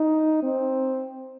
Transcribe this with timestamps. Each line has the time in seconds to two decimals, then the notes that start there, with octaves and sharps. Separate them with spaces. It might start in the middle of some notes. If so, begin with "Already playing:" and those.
Already playing: D#4
0.43 C4